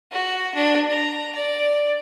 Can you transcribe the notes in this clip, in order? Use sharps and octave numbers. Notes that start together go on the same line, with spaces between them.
F#4
D4
A#5
D5